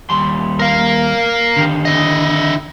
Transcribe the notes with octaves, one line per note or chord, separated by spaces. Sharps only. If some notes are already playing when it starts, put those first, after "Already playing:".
D#2 G3 C6
A#4 F5
D3 D#3 G4
E4 D#5